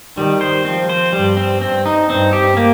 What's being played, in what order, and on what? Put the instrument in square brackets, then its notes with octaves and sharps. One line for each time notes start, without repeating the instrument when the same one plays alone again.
[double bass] D#3 [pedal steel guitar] G3
[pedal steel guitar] C5
[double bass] F3 [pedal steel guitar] C4
[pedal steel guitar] C5
[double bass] G2 [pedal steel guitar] G3
[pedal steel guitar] C4
[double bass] G2 [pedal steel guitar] C4
[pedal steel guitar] D#4
[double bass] G2 [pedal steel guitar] C4
[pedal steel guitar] G4
A#3